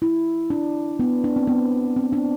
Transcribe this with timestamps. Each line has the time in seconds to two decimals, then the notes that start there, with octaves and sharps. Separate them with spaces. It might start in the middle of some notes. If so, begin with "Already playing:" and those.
0.02 E4
0.50 D4
0.99 B3
1.24 D4
1.36 C4
1.47 B3
1.96 C4
2.13 D4